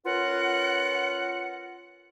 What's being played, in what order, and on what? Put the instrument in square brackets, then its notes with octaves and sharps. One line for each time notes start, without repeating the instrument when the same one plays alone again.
[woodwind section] C#4 F4 A#4 B4 F#5